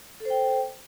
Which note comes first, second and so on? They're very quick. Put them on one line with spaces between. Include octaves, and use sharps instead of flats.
A4 C5 G5